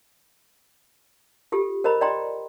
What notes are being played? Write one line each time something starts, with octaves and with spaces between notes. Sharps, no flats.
F4 G4 A4
A#4 C5 D#5 A#5 B5
D5 D#5 G5 A#5 C6